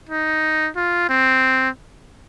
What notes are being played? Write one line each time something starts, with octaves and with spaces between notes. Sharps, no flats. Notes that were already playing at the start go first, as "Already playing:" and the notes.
D#4
F4
C4